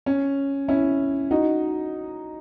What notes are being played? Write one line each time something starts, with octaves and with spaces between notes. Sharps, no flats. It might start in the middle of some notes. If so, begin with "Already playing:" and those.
C#4
C#4 E4
D#4 F#4